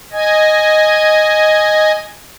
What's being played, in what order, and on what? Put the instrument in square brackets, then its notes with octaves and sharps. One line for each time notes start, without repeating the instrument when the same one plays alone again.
[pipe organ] D#5 G#5